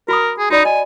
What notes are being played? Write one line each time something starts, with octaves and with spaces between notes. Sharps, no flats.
F#4 A#4 B5 D#6
G#4
D#4 F#4 D5 B5
D#5 G#5